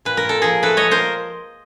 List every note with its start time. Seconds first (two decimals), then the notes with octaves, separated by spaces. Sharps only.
0.05 A#2 B4
0.17 A#4
0.25 A#2 A4
0.42 F3 G#4 A#4
0.63 A3 A4 B4
0.77 A#2 C#5 D#5
0.91 A#4 C5